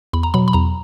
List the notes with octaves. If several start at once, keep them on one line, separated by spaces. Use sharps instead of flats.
E2 B5
A#5
B2 F#3 B5
B5
E2 A#5